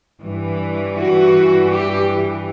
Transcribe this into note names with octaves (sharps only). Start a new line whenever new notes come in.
G2 E3
F#4
G4